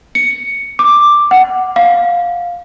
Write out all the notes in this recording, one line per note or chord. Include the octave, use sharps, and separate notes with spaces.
C#7
D6
F#5
F5